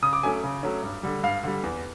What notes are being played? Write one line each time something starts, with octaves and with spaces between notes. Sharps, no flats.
C#3 D#6
D6
F#3 A3 C#4 G#5
C#3
F#3 A3 C#4
G2
D3 G3
G2 F5
D3 G3
E2